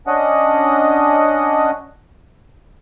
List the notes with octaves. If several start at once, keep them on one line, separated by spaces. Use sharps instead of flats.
C#4 D4 D#5 F#5